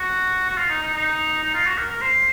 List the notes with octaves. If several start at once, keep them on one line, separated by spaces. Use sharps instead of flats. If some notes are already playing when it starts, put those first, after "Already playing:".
Already playing: F#4
F#4
F4
D#4
D#4
D#4
D#4
F4
F#4
A#4
A#4
C5